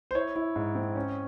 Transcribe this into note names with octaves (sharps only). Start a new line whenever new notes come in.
C5
E4 C#5
E4
G#2
C4
C#4